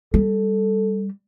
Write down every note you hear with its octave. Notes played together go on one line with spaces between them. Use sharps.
G3 A4